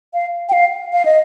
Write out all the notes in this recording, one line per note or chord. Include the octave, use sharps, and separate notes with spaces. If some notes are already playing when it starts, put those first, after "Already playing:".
F5
G5
F5
F5
D#5